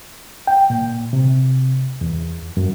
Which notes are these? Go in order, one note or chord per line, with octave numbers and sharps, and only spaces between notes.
G5
A#2
C3
E2
F#2